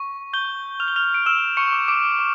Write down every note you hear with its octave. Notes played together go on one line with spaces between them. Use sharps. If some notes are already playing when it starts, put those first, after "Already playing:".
Already playing: C#6
C#6 G6 G7
F6 F7
G7
F6 F7
D7
E6 F6 E7
C#6 C#7
D6
D6 D7
D6